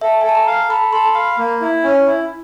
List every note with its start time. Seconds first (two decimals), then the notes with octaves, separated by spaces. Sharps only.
0.01 A4 E5
0.21 G#5
0.24 A4
0.29 A5
0.35 A#5
0.47 F5
0.69 A4 B5
0.93 A4 C6
1.15 F5 B5
1.38 A#3
1.61 E4
1.84 C#4
2.06 E4